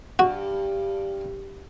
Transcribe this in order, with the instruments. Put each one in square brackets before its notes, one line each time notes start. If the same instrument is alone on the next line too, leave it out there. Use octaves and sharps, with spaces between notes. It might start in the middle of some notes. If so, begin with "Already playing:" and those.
[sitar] G2 [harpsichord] F#4